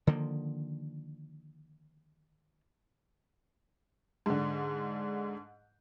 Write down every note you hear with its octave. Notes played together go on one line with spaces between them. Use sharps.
D3 D#3 F3 A#3
G#2 D3